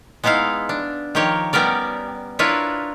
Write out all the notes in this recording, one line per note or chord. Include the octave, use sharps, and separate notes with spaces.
G#3 B3 D#4 E4 F5
D4
D#3 F3 G4 A#4 C#5
G3 B3 C#4 A#4 D5
D4 E4 F4 A#4 B4 C#5